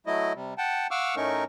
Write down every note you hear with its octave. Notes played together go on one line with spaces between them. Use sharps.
F#3 A3 E4 D#5
C3 G3
F#5 G5 A5
F5 F#5 C#6 D6 E6 F6
A2 A3 C#4 D#4 A#4 C#6